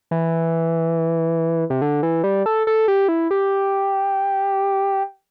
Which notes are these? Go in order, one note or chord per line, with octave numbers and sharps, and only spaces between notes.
E3
C3
D3
E3
G3
A4
A4
G4
E4
G4